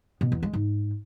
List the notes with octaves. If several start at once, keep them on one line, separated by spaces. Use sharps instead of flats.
B2
E2
G#3
G#2